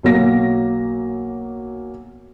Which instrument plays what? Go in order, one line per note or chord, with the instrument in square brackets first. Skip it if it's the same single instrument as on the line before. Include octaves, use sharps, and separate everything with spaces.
[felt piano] B1 F#3 A#3 A#6